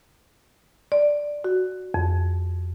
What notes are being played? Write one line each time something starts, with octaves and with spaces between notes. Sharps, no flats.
D5
F#4
F2